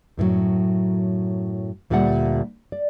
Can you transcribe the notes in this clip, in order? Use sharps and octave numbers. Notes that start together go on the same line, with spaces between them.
F#2 A2 D#3 F#3
D2 A#2 G3 A3 E5 F#5
D5